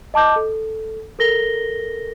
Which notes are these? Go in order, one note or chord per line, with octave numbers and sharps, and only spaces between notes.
D#5 A5 D6 G6
A4
A4 A#4 A#6 G7